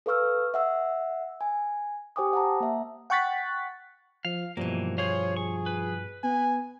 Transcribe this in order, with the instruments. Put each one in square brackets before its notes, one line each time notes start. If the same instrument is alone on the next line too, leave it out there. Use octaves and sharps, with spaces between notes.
[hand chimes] A4 B4 F5 C#6 E6 F6
E5 F#5 E6
G#5
G4 C5 G5 G#5 D6 D#6
F#5 A5 A#5
A#3 E5
[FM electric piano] F#5 G5 C#6 F#6 A6 B6
[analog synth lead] F3 [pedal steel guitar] F5
[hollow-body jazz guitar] G2 B2 [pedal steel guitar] E3 A#3 [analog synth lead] F3
[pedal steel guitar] G#4 C5 F5 [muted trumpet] C#5
[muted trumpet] G#4 [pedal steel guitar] C#6
[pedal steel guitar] B4
[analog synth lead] B3 [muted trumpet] G#5